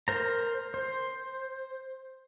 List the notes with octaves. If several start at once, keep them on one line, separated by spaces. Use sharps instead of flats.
A#4 C5 A#5
C5